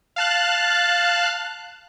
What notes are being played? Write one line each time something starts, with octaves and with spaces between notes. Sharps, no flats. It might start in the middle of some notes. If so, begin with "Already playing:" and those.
F5 A5 F#6